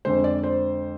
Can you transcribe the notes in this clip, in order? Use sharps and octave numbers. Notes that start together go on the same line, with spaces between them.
F2 D3 G#3 C5
D5
C5